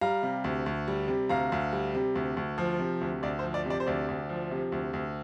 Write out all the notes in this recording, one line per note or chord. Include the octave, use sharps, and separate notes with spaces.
G3 F5 A#5
C3
D2
D2
G3
C3
D2 F5 A#5
D2
G3
C3
D2
D2
F3
C3
D2
D2 D5
C5
F3
D5
C3 D5
C5
D2 D5
D2
F3
C3
D2
D2